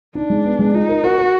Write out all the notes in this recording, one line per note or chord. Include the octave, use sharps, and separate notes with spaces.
D4 D#4
G#3
B3
G#3
D#4 F4
A#4
F#4 A#4
A#4